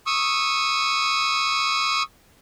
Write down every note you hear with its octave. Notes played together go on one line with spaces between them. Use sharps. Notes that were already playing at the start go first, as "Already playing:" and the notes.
C#6 D#6 E6